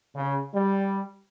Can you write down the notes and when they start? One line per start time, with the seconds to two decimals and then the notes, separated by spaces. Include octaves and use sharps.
0.15 C#3
0.55 G3